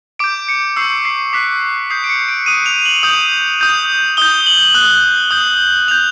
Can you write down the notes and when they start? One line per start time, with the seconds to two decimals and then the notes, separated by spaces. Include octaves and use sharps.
0.19 D6 G6 D7
0.48 C#7
0.76 C#6 E6 G6 C7
1.05 C7
1.33 D6 F#6 B6
1.90 D#6 G6 C7
2.04 D7
2.10 C#7
2.29 D7
2.46 D#6 F#6 D#7
2.66 F7
2.85 F#7
3.03 D#6 G6
3.61 D#6 G6
4.17 D#6 G6 G7
4.46 F#7
4.75 D#6 F#6
5.31 D#6 G6
5.88 D#6 G6 F7